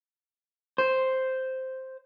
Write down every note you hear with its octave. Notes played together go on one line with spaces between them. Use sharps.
C5